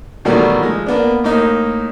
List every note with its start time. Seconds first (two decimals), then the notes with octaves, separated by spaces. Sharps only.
0.25 B2 D#3 E3 F#3 G3 A3
0.60 F3 G#3
0.86 A#3 B3 D4
1.24 A2 A#3 D#4